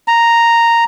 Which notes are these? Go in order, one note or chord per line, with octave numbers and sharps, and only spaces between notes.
A#5